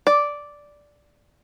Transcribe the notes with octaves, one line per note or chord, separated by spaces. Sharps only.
D5